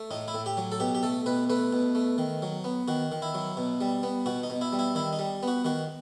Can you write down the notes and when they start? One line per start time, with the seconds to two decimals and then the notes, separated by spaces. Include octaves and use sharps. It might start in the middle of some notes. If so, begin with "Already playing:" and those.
Already playing: A3
0.11 A2 D#4
0.28 E4
0.34 A2
0.46 G4
0.57 F#3
0.72 A4
0.80 B2 G4
0.95 G4
1.03 A3 A4
1.26 B2 B4
1.50 A3 B4
1.73 B2
1.95 A3
2.18 D#3
2.42 F#3
2.64 B3
2.88 D#3 F#4
3.12 D#3
3.22 E4
3.34 F#3
3.57 B2
3.81 G3
4.03 B3
4.26 B2 F#4
4.43 D#4
4.50 B2
4.61 E4
4.72 G3
4.79 E4
4.95 D#3 E4
5.13 D#4
5.19 G3
5.43 B3 F#4
5.65 D#3 F#4